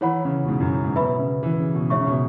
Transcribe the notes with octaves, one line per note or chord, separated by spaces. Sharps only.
E3 E4 C#5 F#5 B5
C#3
B2
G#2
F#2
G#2
B2 B4 E5 B5
C#3
E3
C#3
B2
G#2 C#5 E5 C#6
C#3
B2